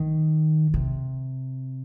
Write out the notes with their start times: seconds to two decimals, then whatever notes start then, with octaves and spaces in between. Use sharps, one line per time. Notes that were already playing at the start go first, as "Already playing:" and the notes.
Already playing: D#3
0.74 C3